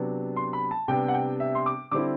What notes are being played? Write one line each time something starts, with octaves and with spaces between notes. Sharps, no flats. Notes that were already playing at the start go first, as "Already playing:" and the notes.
Already playing: C3 F#3 B3 D4
C6
B5
A5
C3 G3 B3 D4 G5
F#5
G5
E5
C6
D6
D3 G3 C4 E4 D6